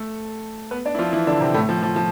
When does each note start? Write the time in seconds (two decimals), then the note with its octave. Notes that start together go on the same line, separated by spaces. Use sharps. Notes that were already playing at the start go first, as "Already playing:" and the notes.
Already playing: A3 A4
0.71 B3 B4
0.85 D4 D5
0.95 E4
0.99 F3 F4
1.13 E3 E4
1.27 D3 D4
1.41 C3 C4
1.54 A2 A3
1.69 F3
1.83 F3
1.96 F3